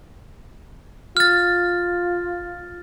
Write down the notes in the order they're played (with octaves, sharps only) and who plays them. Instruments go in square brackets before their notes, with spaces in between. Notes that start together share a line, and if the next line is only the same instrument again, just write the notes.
[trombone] F4 [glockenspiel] F6 A6